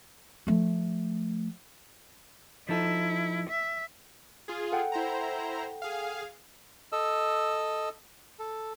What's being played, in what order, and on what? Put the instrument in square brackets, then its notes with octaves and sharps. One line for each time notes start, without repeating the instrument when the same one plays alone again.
[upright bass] F3 A3
[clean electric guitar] F3 D#4 A4 [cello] E4
[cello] E5
[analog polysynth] F4 G#4
[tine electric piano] A4 F#5 G5
[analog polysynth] E4 C5 A#5
G#4 F5
[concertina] A4 D#5 E6
A4